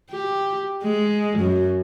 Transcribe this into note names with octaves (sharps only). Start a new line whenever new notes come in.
G4
G#3
F#2